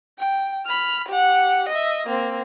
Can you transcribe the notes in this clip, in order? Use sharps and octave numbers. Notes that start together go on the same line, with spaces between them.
G5
B5 F6
G4 F#5
D#5 E5
A#3 C4